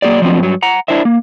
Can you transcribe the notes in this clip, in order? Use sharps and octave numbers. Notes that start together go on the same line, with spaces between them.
F#3 A#3 G4 G#4 D5
F3 F#3 A3 B3 C4 D4
G2 F#3
F#5 A#5
D4 E4 A#4 C5 E5
A#3